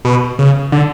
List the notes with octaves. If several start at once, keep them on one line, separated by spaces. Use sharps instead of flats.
B2
C#3
D3